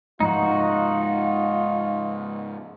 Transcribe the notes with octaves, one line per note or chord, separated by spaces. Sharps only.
G#2 F3 G#3 D#4 F4 F#4